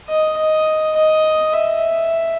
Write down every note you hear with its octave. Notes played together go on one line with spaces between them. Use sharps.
D#5
D#5
D#5
E5